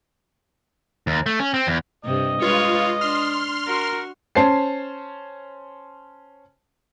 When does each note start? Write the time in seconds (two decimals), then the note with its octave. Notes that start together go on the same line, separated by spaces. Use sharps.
1.07 D#2
1.26 A3
1.39 C#4
1.54 C4
1.67 E2
2.05 G2 C3 D#5
2.42 G#3 F4 B4 C#5
3.01 D4 C6 F6
3.67 F#4 A#4
4.35 C#4 C5 A5 C7